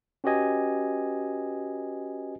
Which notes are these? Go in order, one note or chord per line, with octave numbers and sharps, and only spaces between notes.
C#4 F#4 G4 B4 D#5 G#5